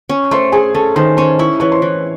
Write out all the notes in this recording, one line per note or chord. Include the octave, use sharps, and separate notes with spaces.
C#4
A3 C5 C6
A3 G#4 G#5
C#4 A4 A5
D#3 C5 C6
C#4 C5 C6
E4 C#6
E3 C#5 C#6
C5 C6
E3